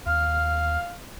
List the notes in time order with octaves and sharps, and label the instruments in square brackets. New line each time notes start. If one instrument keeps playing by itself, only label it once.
[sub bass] D#2 [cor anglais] F5 [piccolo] F6